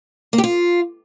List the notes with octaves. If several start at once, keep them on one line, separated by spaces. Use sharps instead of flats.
A#3
G4
F4